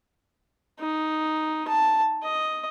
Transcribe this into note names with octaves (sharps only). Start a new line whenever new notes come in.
D#4
A5
D#5